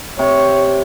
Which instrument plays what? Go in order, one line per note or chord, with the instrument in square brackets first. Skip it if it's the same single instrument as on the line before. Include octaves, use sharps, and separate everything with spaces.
[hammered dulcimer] C3 [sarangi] C#5